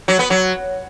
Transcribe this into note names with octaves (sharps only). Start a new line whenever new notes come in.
F#3
B3
F#3